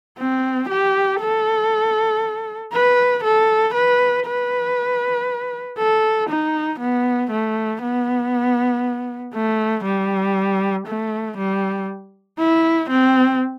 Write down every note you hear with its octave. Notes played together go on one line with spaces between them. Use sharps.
C4
G4
A4
B4
A4
B4
B4
A4
D#4
B3
A3
B3
A3
G3
A3
G3
E4
C4